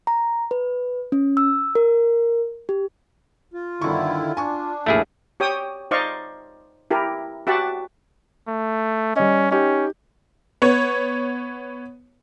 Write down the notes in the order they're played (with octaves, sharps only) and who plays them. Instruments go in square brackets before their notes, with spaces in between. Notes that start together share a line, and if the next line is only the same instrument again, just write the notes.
[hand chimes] A#5
B4
C#4
E6
A#4
G4
[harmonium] F4
[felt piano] G1 C#6 [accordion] D3 D#3 E4
[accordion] D4 [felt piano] G#5 C#6
[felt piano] A#1 D#2 [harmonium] A2 A#3 F5 [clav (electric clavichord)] A3 E4 G#4
[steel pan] G4 C#5 G5 D#6
D#4 C5 D5 D#5 F5 C#6
E4 G4 A#4
F#4 G4 E5 F#5 A5
[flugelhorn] A3
[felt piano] G3 D#5 [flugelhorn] C#4
[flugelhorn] C#4 [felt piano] D#4 G4
[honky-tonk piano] B3 C#5